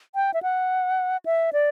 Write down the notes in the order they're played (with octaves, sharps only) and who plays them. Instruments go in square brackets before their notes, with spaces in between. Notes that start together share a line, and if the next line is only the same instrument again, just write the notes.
[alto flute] G5
E5
F#5
E5
D5